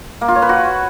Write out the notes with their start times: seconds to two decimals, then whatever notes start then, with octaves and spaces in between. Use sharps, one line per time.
0.21 A#3
0.28 F4
0.35 C#5
0.42 B4
0.49 F#4